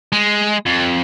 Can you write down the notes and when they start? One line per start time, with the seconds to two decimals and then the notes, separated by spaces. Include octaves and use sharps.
0.12 G#3
0.66 F2